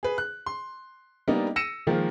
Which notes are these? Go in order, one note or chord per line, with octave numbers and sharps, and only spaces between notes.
G#4 B4
F#6
C6
G3 A#3 B3 D4 D#4
E6 A#6 C#7 D#7 E7
D#3 F3 G#3 A#3